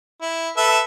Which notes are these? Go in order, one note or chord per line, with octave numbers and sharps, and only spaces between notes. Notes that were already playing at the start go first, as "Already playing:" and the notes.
E4
A4 B4 E5